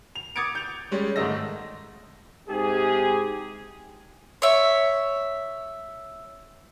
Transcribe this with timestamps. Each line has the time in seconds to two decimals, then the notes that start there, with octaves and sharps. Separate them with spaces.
0.15 F7
0.36 D6 D#6 G#6 A6 C#7 D7
0.55 G6 F7
0.91 G3 G#3 C#4
1.16 G#2 D#3 A3 D#5 E6 A#6
2.49 G#2 C3 G4 G#4
4.42 C#5 E5